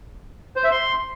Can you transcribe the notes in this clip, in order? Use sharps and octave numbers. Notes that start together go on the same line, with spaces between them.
C5
E5
C6